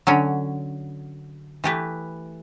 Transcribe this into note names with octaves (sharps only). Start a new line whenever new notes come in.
D3 F#3 C#4
E3 A3 E4 G4 B4